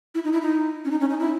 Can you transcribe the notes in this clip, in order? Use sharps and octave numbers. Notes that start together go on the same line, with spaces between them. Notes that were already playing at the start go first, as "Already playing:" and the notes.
E4
D#4
E4
D#4
C#4
D#4
C#4
D#4
E4